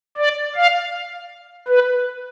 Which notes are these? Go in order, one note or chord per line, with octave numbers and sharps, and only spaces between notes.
D5
F5
B4